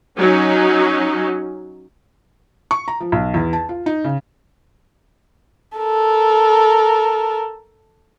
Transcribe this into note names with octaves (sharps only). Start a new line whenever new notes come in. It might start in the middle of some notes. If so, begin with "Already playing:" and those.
F#3 C#4 D#4
C#6
A#5
F3
B1
E2
A5
F4
D#4
C#3
A4 A#4